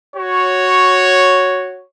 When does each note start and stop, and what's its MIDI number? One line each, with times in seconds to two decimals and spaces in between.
0.16 1.83 66
0.16 1.83 73